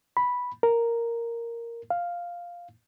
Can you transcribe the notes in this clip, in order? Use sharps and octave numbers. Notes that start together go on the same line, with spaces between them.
B5
A#4
F5